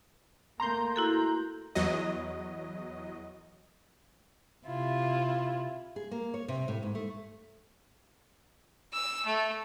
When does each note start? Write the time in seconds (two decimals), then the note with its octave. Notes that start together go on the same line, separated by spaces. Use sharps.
0.60 A3 A#3 A#5 C6 G6
0.96 E4 F#4 A4
1.75 E2 F#3 D#5
4.66 C3 E4 F4
5.96 G#4
6.11 A#3
6.34 C#5
6.48 C3
6.68 A2
6.83 G#2
6.95 A3
8.93 E6
9.26 A3